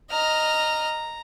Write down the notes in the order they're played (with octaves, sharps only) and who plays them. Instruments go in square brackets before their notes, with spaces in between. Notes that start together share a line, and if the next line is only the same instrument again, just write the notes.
[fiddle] D#5 F6 [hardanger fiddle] A#5